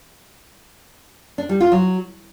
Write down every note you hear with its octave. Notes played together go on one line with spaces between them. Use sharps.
D4
G3
F4
F#3